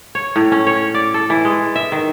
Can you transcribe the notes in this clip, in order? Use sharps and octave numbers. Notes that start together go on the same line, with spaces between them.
C#5
A2
C#4
C#5
D5
A4
E3
G#3
E5
D#3